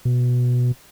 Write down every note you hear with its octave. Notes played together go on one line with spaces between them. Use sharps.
B2